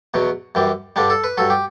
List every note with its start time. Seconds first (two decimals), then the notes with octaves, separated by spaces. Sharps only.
0.14 E2 B2 F#3
0.55 F#2 E3 G3
0.96 G2 D3 G3 D4
1.10 A4
1.24 B4
1.37 G2 F#3 A4
1.50 G4